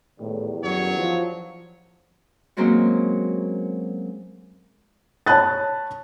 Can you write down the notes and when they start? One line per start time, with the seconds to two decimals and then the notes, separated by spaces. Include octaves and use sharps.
0.20 E2 A2 D#3 G3
0.64 F#2 F#3 C#5
0.98 F3
2.57 F#3 G#3 A#3 C4 C#4 F#4
5.26 C#5 A5 B5 F#6 A6